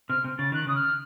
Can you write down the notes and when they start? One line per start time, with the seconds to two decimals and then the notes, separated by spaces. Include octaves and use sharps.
0.09 C3 F6
0.24 C3
0.38 C#3 A6
0.52 D#3 F#6
0.67 C#3 D#6
0.76 F6